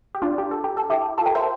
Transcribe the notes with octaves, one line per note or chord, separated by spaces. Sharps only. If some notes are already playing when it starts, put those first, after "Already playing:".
G4
D4 F4
G4
A4
G4
A4
E4 G4
F4 A4
G4 A#4
C5 E5